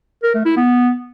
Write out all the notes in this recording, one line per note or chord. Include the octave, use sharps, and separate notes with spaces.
A#4
A3
E4
B3